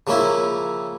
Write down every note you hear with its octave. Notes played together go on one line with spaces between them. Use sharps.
C#3 F3 A#3 C#4 E4